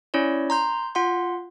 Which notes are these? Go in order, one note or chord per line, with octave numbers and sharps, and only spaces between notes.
C#4 E4 C#5 D5
A#5 C6 G6
F4 F#5 C6